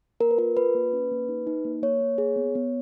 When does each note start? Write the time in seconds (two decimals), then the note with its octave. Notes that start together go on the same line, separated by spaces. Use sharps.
0.20 A#3 A#4
0.31 B4
0.38 F4 A#4
0.57 F4 B4
0.75 A#3
0.93 C#4
1.11 A#3
1.28 D#4
1.47 D#4
1.65 A#3
1.82 A#3 C#5
2.01 A#3
2.18 G#4
2.36 B3
2.55 B3